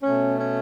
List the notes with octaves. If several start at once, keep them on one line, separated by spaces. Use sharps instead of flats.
B2 A3 C#4
C#4